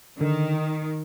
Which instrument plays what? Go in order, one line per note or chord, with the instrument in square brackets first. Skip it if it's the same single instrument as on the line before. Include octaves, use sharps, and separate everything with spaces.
[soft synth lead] D3 [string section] D#3